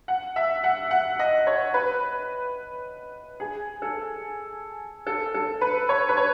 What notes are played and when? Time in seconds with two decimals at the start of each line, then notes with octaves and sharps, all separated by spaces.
0.08 F#5
0.36 E5
0.64 F#5
0.91 F#5
1.19 D#5
1.47 C#5
1.74 B4
3.40 G#4
3.82 A4
5.07 A4
5.34 A4
5.61 B4
5.89 C#5
6.09 B4
6.17 C#5